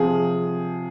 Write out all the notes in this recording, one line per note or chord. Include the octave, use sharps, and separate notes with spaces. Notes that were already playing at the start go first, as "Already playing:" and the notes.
Already playing: C3 F3 G#4